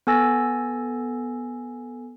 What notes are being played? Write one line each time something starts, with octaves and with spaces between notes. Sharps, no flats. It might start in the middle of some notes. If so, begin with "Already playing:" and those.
B3 A4 G#5 E6 A6 A#6